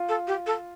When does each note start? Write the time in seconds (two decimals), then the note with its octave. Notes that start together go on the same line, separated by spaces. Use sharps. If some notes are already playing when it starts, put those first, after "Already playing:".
Already playing: F4
0.09 A4
0.28 G4
0.47 A4